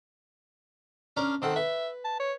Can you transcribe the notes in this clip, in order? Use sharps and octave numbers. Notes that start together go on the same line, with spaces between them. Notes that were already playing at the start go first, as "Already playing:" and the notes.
C#4 D4 A#4
D#3 C4 A4 F#5
B4 E5
A5
C#5